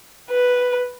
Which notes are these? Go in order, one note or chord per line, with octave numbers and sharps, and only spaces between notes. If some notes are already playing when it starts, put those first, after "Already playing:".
B4